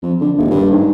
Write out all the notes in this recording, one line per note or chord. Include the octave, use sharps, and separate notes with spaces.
F2
D3
D#1
G2
G#2